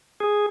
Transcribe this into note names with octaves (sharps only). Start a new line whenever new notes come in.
G#4